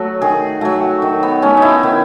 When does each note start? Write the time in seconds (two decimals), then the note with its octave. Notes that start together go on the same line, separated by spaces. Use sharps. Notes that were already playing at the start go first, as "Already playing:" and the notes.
Already playing: F#3 A3 F#4 A4
0.22 D#3 G#4
0.61 F#3 A3 F#4
1.02 D#3
1.23 B3
1.42 A3 C#4
1.57 D#4
1.62 E4
1.83 D#3